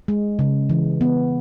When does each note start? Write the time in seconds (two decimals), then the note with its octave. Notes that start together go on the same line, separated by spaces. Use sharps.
0.08 G#3
0.39 C#3
0.70 E3
1.01 B3